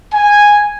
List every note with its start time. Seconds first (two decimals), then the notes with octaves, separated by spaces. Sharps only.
0.13 G#5